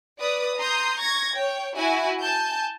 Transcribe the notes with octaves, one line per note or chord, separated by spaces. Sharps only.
B4 D5 D#6
A#5 C6 D#6 G6
C#6 G#6 A#6
C#5 G5
E4 F#4 G#5
G#5 A5 G6